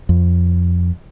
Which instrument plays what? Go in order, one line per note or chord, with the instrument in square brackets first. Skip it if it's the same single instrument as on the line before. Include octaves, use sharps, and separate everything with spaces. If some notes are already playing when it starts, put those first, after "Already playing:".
[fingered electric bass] F2